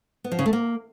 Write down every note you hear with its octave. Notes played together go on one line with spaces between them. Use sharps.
B3
F3
C#3
A3
A#3